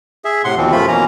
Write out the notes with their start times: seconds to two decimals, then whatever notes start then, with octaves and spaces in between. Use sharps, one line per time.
0.25 G#4 E5
0.44 A2 C3 F#5 C6
0.57 D#2 B2 E3 F3 C4
0.72 F#2 C3 F3 A3 F4 B5
0.88 B2 E3 A#3 C#4 A#5